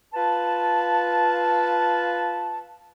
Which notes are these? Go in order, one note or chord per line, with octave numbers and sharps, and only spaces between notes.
F4 B4 A5